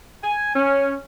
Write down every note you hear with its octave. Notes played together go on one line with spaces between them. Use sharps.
G#5
C#4